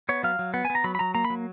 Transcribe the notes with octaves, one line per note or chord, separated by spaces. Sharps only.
B3 C#5
F#3 F5
F#3
B3 F#5
G#5
B3
A#5
F#3 B5
B5
F#3 A#5
A#3 A#5
B5
F#3